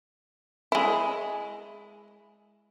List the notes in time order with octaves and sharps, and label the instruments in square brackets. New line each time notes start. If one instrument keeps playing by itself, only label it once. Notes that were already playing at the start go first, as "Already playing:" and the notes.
[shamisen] G#3 E4